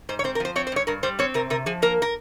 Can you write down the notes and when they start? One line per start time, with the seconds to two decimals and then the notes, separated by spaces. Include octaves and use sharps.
0.09 G#2 C5
0.19 C#5
0.24 C4 C5
0.35 A#4
0.40 F3 C5
0.56 C4 C#5
0.67 C5
0.72 G2 C#5
0.87 G2 A#4
1.03 G3 C5
1.19 C4 C#5
1.34 C3 A#4
1.50 C3 A#4
1.66 F3 G#4
1.82 A#3 A#4
2.02 A#4